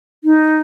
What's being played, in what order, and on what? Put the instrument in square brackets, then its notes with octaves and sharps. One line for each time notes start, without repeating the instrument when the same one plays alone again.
[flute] D#4